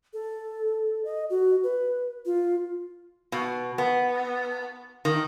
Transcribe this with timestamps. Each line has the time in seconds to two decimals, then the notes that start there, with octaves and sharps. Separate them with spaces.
0.13 A4
1.05 D#5
1.30 F#4
1.63 B4
2.26 F4
3.32 B2
3.78 B3
5.05 D#3